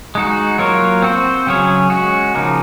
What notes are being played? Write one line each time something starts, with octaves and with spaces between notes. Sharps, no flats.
G#3 D#4 F#4
F#3 A#3 F4 A#4 C#5
C4 F#4 C5
C#3 F#3 C#4 G#4 C#5
G#3 C#4 F#4
C#3 F3 A#3 D#4